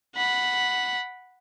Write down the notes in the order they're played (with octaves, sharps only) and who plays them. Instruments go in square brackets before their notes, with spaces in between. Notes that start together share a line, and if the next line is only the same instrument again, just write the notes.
[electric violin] F#5 B5